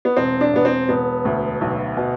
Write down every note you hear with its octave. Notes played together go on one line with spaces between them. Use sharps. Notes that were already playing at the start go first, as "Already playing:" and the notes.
B3
E1 C4
D4
E1 B3
C4
E1 B3
D2
B1
B2